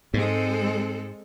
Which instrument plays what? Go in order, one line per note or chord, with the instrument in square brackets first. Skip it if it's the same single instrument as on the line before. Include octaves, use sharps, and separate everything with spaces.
[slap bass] G#2 [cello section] G#3 C4 A4